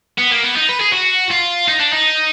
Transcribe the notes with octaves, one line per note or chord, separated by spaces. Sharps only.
B3
A#3
B3
D#4
B4
G#4
F#4
F4
D#4
D4
D#4